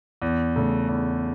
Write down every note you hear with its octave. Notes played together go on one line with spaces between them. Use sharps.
E2
C#3 A3
E2